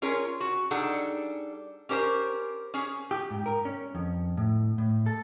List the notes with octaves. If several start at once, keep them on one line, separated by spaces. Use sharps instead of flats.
C#4 F4 G#4 A#4 C#5
F#4
G3 D4 D#4 G#4 A4 F#5
C#4 G4 A#4 C5
C#4 G#4
G4
G#2
A#4
C#4
F2
A2
A2
A4